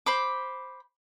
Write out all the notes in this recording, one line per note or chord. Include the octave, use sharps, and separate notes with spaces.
C5 B5 D6